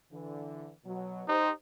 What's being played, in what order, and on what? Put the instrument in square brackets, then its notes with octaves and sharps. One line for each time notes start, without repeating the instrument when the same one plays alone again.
[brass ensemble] D3 E3
B2 F#3
[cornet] D#4 [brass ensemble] G4 C5